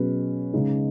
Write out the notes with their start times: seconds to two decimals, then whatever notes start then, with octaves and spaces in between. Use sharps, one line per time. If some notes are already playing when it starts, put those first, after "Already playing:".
Already playing: B2 F#3 C#4 G#4 B4
0.54 C#3 G#3 D#4